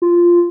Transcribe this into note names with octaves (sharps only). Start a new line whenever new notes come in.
F4